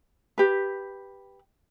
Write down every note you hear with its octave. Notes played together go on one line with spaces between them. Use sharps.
G4 B4